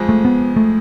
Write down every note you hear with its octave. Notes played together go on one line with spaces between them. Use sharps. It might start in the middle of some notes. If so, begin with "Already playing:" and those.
Already playing: F2 F3 G#3
A3
B3
A3